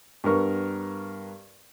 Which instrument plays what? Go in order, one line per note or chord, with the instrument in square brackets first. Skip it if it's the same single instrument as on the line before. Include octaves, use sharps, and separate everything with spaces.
[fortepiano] G2 B3 A#4 C#6